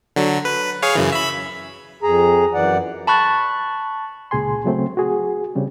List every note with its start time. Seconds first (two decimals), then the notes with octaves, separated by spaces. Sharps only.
0.16 D3 F#3
0.45 B4
0.82 G#4 C#5 F5
0.95 F#2 C#3 E3
1.12 E5 B5
2.03 F2 G#4 A#5
2.54 F#2 E3 D5 F#5
3.07 A5 B5 C#6 F#6 A6
4.31 C#2 A#2 G#4 G#5 C6
4.64 C#3 F#3 A3 C4
4.97 F#4 G#4
5.55 C#3 G3 C4